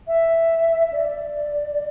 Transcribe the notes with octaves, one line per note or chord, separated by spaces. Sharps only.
E5
D5